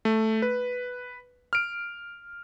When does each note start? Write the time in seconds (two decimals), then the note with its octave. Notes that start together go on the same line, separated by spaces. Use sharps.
0.05 A3
0.42 B4
1.53 F6 D7